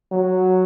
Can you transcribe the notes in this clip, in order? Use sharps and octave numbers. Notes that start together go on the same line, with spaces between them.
F#3